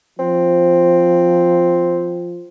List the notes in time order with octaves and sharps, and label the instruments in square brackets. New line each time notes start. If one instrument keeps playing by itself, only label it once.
[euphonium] F3 [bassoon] C4